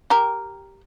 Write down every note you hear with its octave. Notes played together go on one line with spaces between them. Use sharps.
G4 A#4